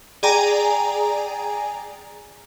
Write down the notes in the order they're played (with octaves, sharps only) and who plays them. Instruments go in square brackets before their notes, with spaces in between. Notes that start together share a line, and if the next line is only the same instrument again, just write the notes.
[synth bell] G#4 D5 G5 G#5 A#5